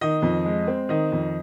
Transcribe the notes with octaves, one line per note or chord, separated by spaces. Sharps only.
D#3 D#5
F2
G#3
C4
D#3 D#5
F2